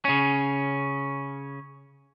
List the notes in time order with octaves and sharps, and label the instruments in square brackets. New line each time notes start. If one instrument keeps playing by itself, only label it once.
[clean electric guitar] C#3 C#4